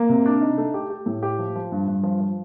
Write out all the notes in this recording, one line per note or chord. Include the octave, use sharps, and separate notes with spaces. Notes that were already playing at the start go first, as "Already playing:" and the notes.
Already playing: A#3
C3
D4
D#4
A3
G4
G4
A2
G4
F3
F3
G2
G2
F3
F3